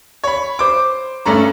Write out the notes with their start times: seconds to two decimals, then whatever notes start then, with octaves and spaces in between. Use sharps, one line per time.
0.24 C#5 B5
0.59 C5 D6
1.26 G2 A3 C#4 A#5